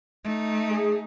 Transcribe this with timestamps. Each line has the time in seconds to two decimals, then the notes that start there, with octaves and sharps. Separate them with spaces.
0.25 A3 D#4
0.71 G#4